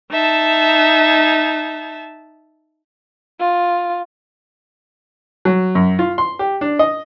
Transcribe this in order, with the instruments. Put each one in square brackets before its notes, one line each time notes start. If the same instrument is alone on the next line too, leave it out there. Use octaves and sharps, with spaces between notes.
[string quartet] D#4 E5 A5
[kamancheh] F4
[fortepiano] F#3
F#2
F4
C6
G4
D4
D#5